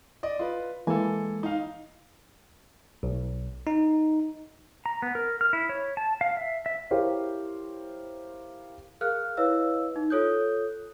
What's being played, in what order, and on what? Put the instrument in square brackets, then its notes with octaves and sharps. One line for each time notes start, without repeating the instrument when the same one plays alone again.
[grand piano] D5 D#5
F4 B4
[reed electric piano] E3 G#3 A#3 [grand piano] A4 G#5
[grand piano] D#4 F5
[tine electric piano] B1
D#4
[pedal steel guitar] A#5
B3
A#4
F6
E4
C#5
A5
F5
E5
E5
[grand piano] E4 G4 A#4 C5 C#5 F5
[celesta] G#4 A#4 F5 F6 F#6
E4 B4 C#5 D#5 F5 E6
D#4
F4 A4 C#5 D#6 F#6 G6